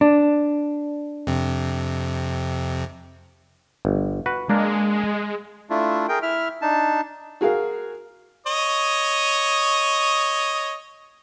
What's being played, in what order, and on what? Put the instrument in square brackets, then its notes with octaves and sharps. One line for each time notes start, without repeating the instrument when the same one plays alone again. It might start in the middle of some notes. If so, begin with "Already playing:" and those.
[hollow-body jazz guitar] D4
[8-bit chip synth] F2 C3
[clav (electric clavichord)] G1
F#4 B4
[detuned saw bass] G#3 [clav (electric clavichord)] A#3 D4 A#4
[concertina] A3 D4 E4 F4
G#4 A#4 G5
E4 E5 F6
D4 D#4 A5
[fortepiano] F#4 G#4 A#4 F5
[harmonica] C#5 D#5 D#6